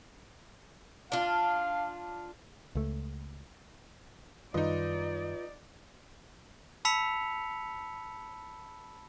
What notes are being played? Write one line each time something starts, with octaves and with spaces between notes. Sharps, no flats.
D4 F4 F5
C#2 A3
F#2 D#3 G3 D#4 F4 B4 D5 D#5
A5 B5 E6 B6 C#7 F7